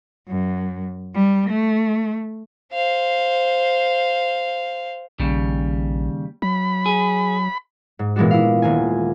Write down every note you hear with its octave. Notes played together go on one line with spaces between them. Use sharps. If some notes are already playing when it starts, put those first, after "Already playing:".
F#2
G3
A3
C5 F5
A#1 D#2 C#3 G3
F#3 B5
G#4
G#2
A#2 E3 G#3 B3 D4 F#4
E4 F5
D#1 A#3 G#5